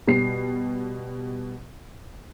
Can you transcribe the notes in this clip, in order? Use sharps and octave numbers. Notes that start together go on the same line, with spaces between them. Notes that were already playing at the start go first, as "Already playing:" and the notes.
B2 G3 C7